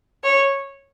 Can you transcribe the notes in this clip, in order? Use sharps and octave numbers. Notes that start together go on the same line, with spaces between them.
C#5